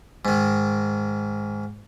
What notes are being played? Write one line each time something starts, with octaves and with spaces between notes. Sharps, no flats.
G#2 D#3